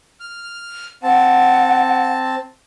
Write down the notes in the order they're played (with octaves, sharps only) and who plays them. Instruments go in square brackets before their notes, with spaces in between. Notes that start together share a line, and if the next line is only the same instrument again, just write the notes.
[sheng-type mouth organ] F6
[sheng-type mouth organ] C4 A5 [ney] F#5